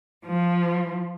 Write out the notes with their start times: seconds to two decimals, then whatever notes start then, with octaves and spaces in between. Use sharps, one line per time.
0.24 F3